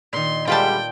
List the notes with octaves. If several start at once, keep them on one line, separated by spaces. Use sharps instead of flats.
A#2 D#3 C6
D3 G3 G#3 F4 B4 D5 G5 A5